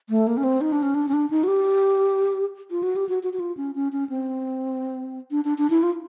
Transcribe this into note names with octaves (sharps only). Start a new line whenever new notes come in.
A3
A#3
C#4
C4
D#4
D4
C#4
D4
C#4
D4
D#4
F#4
G4
F4
F#4
G4
F#4
F#4
F#4
F4
C#4
C#4
C#4
C4
D4
D4
D4
E4
F4